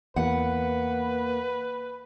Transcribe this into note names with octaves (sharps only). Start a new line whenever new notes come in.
E2 A#3 B4 F#5